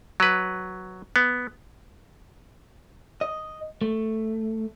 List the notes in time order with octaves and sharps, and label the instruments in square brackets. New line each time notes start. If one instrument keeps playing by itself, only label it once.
[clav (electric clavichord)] F#3 B4
B3
[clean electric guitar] D#5
A3